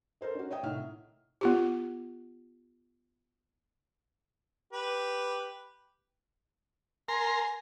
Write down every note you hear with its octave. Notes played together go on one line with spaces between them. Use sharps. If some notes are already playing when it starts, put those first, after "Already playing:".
A4 A#4 C5 D#5
C#4 F#4
C#5 D#5 E5 G5 D#6
C2 A2 D#3 E5 F#5 F6
B3 F4 G4
G4 B4
A#4 G#5 A#5 C6